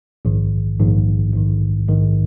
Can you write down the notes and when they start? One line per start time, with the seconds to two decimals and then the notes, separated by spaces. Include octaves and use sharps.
0.25 A#1 G#2 D#3
0.79 A#1 G#2 D#3
1.34 A#1 G#2 D#3
1.88 A#1 G#2 D#3